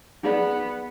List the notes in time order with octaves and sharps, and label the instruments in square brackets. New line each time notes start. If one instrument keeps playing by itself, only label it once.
[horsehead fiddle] B3 [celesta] D#4 G#4 D5